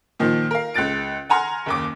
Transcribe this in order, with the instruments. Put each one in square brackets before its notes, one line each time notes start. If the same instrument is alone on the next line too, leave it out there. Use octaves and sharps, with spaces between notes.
[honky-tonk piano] A#2 D#3 F3
A#4 F5
C#2 F#6 A6 D7
F#5 G#5 A#5 C6 F6
F#1 D#2 D6